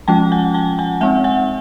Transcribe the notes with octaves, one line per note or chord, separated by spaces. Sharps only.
F3 G#3 C#4 F4 G5 A5
F#5 G#5
G5 A5
F#5 G#5
G#3 C4 D#4 E5 F#5
F#5 G#5